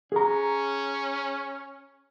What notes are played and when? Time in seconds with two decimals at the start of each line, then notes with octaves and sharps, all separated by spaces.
0.12 C#4 G#4 A#5